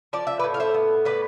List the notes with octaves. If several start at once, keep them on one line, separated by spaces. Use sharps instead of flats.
F3 D5
E5
B4 D5
A2
F5
C5 E5
B3
A2 B4 D5